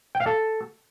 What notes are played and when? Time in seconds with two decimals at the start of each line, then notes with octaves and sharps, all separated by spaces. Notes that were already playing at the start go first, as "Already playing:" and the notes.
0.15 G5
0.20 F5
0.26 A4